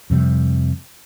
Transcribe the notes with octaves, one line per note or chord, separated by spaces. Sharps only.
F2 C3 G3